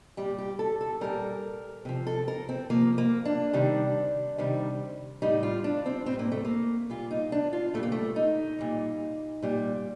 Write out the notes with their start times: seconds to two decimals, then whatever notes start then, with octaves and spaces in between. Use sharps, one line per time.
0.17 A#2 G3 G4
0.38 G4
0.59 A4
0.81 A4
1.01 A#2 G3 A#4
1.85 C3 F3
2.07 A4
2.28 A#4
2.49 C4
2.70 C3 F3 A#3
2.98 A#3
3.25 D4
3.53 C3 D#3 G3
4.38 C3 D#3 G3
5.22 A2 G3 D#4
5.43 F4
5.64 D4
5.86 C4
6.06 A2 G3 C4
6.19 A#3
6.32 A3
6.45 A#3
6.90 A#2 G3 F4
7.11 D#4
7.32 D4
7.53 F4
7.74 A#2 G3 A3
7.83 A#3
7.92 A3
8.16 D#4
8.59 A#2 G3
9.42 A#2 G3